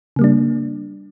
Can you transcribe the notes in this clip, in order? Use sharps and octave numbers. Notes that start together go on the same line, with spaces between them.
C#3 G3 A#3 D4